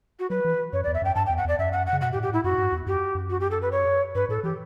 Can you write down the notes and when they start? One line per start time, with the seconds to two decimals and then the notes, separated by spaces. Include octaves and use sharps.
0.19 F#4
0.30 F#3 B4
0.45 E3
0.73 F#2 C#5
0.84 D5
0.87 E2
0.94 E5
1.02 F#2 G5
1.15 G2 A5
1.26 G5
1.29 E2
1.37 F#5
1.45 E2 D5
1.59 F#2 E5
1.72 F#5
1.86 F#5
1.93 C#3
2.01 B2 F#5
2.12 G4
2.16 A2
2.23 G4
2.30 A2 E4
2.44 F#2 F#4
2.58 G2
2.72 E2
2.86 F#2 G4
3.15 F#2
3.30 F#4
3.40 G4
3.51 A4
3.62 B4
3.72 C#5
4.15 G2 B4
4.29 A2 A4
4.43 E3 G4